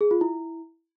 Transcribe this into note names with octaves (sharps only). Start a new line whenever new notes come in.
G#4
F4
E4